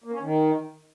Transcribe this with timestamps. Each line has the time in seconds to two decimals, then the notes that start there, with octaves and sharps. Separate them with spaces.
0.04 A#3
0.12 C#4
0.21 D#3